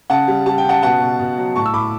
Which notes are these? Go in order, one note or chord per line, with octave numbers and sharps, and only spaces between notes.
C#3 F#5 A5
G3
G3 A5
G5
C#3 F#5 A5
B2 F#5 A5
B2
B2
F#3
A2 A5 C#6
E6
A2 B5 D6